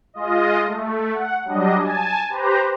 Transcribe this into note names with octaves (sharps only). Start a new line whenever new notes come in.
G#3 F4 D#5
A3
F#5
F#3 G3 D4 D#5
G#5 A5
G4 B4 C5 A#5